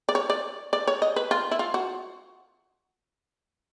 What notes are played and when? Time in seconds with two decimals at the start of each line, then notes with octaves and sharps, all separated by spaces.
0.09 D5
0.15 C#5
0.30 D5
0.73 D5
0.87 C#5
1.02 D#5
1.16 B4
1.31 F4
1.51 E4
1.59 F4
1.74 F#4